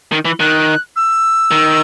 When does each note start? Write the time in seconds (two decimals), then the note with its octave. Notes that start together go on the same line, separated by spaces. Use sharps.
0.12 D#3
0.25 E3
0.40 D#3 F#6
0.96 E6
1.51 D#3